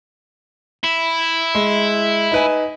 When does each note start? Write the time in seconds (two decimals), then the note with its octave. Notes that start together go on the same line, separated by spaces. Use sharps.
0.84 E4
1.55 G#3
2.32 D#4 B4 G#5